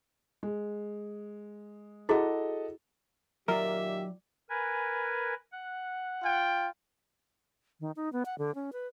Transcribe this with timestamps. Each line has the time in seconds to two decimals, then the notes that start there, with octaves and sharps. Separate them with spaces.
0.43 G#3
2.09 E4 F#4 G#4 A4 D#5 F#5
3.48 A#2 D#3 F#3 F4 G4 A#4 D5 E5
4.50 A#4 B4 G#5
5.52 F#5
6.22 F4 G5
7.80 D#3
7.96 D#4
8.13 B3
8.26 F#5
8.38 D3
8.55 C#4
8.73 B4